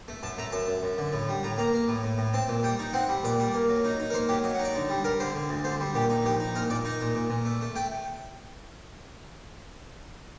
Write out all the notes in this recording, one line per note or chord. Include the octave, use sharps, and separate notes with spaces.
A3
F#2 A5
A3 A#5
F#2 A5
F#2
F#2
D3
A2
G3
A2 A#5
A#3 A#5
A#3
A2
A2
A2
C4 A5
A#2
G3 G5
D#4
C4 F#5
G3
A#2 D5
G3
A#3
F#3
D#4
D#4
A#4
A#3 C5
F#3 G4
F#3 D#5
F#5
D#4 D5
D3
G3
G3 A#4
D3 C5
D3
D2
D3 C5
G3
A#2 G4
D#4
A#1 G4
D#4
A#2 A#4
A#2 D5
D#4 D#5
A#2
A#2
A#2
A3
A3
A3 G5